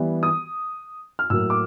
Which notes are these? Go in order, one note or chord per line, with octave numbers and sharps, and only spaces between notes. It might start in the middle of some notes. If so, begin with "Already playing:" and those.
Already playing: E3 G3 B3
D#6
F6
A2 F#3 A#3 E6
D6